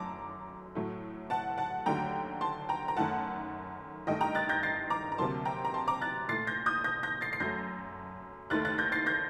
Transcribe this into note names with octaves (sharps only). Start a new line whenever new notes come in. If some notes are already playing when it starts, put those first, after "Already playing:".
Already playing: F#2 F#3 A3 A5 A#5 D6
A2 F#3 A3
F#5 A5
F#5 A5
D#2 D3 F#3 A3 G5 A#5
A5 C6
G5 A#5
A#5
F#2 D#3 A3 F#5 A5
G2 D#3 A3 D#5 G5
G5 A#5
F#6 A6
G6 A#6
A6 C7
A#5 D6
A#5
D2 C3 F#3 A#3 A5 C6
G5 A#5
A#5
A5 C6
A#5 D6
F#6 A6
A#2 A3 A6 C7
G6 A#6
D#6 G6
G6 A#6
G6 A#6
A6 C7
C7
F#2 F#3 A3 G6 A#6
D#2 D#3 A3 F#6 A6
F#6 A6
G6 A#6
A6 C7
G6 A#6